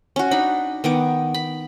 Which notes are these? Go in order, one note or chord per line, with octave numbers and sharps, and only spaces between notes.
C#4 F#4
D4 D#4 B5
D#3 B3 D6
B5